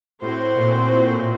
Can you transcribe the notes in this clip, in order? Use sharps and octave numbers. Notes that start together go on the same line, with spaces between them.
A2 C4 F#4 C5
A#2
A#2